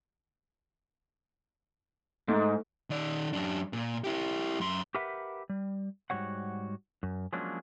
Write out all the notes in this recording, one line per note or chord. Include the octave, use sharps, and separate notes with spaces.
G#2 A3
D#3 D5
F#2 D4
A#2
E4 G4
F#2 C6
G4 A#4 B4 E5 F#5
G3
G#2 F3 G3 F#4 C#5 F#5
F#2
F3 F#3 G#3 A#3 C#4 D4